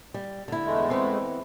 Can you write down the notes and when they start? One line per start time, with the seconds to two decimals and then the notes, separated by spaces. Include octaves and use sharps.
0.14 G3
0.48 D3 E4
0.64 E2 G#3 A3
0.90 E3 B3 C4